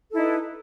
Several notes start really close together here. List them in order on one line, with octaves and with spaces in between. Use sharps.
A4 E4 D#4 B4